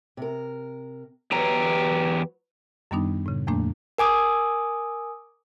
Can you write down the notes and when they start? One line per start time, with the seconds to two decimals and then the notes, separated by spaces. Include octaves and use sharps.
0.17 C3 A#4
1.32 E2 F#3 G4 B4 A#5
2.91 F#2 D#3 G3 B3 D4 D#4
3.26 A2 C#3
3.47 E2 A2 F3 A3 A#3 D4
3.98 A#4 G#5 D6 D#6